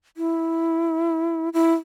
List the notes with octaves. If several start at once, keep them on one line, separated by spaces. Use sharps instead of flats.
E4
E4